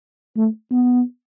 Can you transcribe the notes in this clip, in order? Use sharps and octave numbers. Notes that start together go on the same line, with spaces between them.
A3
B3